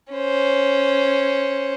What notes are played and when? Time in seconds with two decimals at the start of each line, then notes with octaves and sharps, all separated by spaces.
0.13 C#4 C5